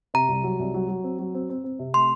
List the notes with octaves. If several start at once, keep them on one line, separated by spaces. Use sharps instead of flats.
C3 A#5
C2
F#3
C2
F#3
F#3
C4
F#3
C4
C4
C4
C3
A3 C6